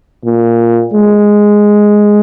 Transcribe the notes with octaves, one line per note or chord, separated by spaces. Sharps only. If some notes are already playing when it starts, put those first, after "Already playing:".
A#2
G#3